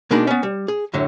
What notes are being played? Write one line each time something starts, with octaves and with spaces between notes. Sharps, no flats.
B2 G#3 A#3 D4 D#4 B5
B3 C#4
G3
G#4
F#2 A2 D3 F#3